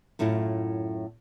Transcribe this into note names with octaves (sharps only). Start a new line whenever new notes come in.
F#2 A2 A3 E4 F4